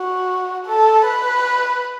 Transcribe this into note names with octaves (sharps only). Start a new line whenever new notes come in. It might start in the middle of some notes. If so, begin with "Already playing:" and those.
Already playing: F#4
A4
B4